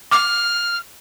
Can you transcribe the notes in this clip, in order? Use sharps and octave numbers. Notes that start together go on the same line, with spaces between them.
D6 F6